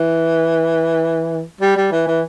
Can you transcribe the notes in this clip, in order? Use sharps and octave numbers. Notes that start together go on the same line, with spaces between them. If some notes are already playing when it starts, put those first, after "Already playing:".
Already playing: E3
G3
G3
E3
E3